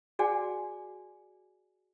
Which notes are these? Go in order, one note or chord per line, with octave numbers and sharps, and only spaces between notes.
F#4 G#4 D5 F#5 G#5